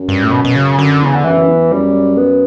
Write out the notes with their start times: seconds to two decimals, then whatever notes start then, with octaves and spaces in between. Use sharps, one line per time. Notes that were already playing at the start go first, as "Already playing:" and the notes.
Already playing: F#2
0.09 G2
0.23 A2
0.31 B2
0.45 B2
0.55 C#3
0.78 F#2 D3
1.01 E2 C#3
1.14 D3
1.24 F#2 E3
1.37 F#2
1.48 E2
1.71 F#2 G3
2.17 B3